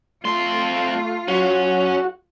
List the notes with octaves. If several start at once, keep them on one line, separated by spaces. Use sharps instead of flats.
F2 A3 F4 C6
F#3 C#4 F#4